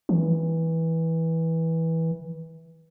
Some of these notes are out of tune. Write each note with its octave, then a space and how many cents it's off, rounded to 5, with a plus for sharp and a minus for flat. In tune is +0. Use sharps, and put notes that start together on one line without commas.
E3 -15